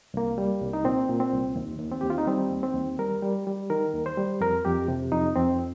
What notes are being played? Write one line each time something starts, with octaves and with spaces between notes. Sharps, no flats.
C2 A#3
G3
C2
D#4
A#2 C4
A#2
C4
C2
D#2
D#2
C4
D#2 G4
F4
D#4
G3 C4
D#2
C4
D#2
G3 A#4
G3
G3
D#3 A#4
D#2
C5
G3
F2 A#4
F2 G4
C3
F2 D#4
F2 C4